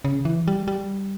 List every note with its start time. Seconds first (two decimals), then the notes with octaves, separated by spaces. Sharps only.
0.04 C#3
0.25 E3
0.48 G3
0.68 G3